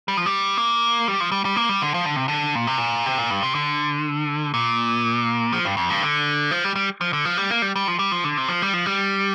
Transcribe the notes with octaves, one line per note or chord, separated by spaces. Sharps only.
G3
F3
G3
A#3
G3
F3
G3
G3
A#3
G3
D3
F3
D3
C3
D3
A#2
C3
A#2
C3
A#2
G2
C3
D3
A#2
F3
G2
F2
G2
D3
F3
G3
G3
F3
D3
F3
G3
A#3
G3
G3
F3
G3
F3
D3
C3
F3
G3
F3
G3